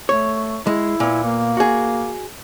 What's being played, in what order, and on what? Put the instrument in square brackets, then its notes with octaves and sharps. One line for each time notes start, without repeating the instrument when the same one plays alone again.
[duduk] A3 [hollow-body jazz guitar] C#5
[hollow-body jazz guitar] G#3 [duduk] E4
[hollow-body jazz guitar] A#2 B3
[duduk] A#3
[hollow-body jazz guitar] F#4 G#4